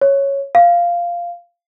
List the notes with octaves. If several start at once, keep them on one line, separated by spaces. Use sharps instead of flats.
C#5
F5